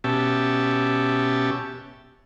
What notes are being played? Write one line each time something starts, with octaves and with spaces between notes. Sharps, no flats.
B2 C#4 G4 E5 A5